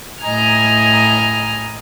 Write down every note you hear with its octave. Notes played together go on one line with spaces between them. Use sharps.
A2 D#5 G#5 A#5 F6